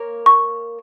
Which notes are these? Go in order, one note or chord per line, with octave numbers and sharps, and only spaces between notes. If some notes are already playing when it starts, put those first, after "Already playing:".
Already playing: A#3 A#4 C#5
C#6